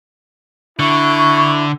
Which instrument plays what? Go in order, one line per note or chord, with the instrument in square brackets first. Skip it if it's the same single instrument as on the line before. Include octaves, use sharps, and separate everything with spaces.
[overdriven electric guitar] D3 [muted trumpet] E4 [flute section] C#6